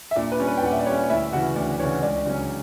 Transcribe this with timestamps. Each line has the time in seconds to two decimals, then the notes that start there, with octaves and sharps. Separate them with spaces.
0.11 E5
0.16 A#2 D4 D5
0.32 B4
0.40 G3 C#4
0.48 B4
0.58 G5
0.63 A#2 F#5
0.72 E5
0.79 D5
0.86 G3 C#4 C#5
1.09 D2 E4 E5
1.32 C#3 E3 F#4 F#5
1.56 D2 D4 D5
1.79 C#3 E3 C#5
2.02 C#2 D4 D5
2.25 C#3 F#3 C#4